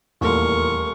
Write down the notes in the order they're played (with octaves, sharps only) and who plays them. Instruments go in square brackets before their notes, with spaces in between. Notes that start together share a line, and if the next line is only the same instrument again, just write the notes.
[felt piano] D#1 A3 C6 [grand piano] E2 A#2 [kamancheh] A#4 [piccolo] C#6